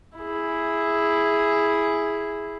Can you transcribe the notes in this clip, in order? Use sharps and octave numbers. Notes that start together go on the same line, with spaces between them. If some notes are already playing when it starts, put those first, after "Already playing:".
E4 G#4